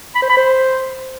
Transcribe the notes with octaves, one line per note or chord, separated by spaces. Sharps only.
B5
C5
B5
C5